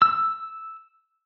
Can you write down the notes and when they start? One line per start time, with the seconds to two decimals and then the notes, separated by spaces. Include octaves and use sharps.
0.02 E6